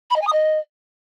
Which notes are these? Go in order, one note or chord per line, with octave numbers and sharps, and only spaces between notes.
B5
D#5
G#5
D#6
D#5